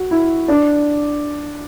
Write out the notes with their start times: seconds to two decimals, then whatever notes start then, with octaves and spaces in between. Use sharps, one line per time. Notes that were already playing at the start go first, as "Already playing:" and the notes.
Already playing: F#4
0.11 E4
0.48 D4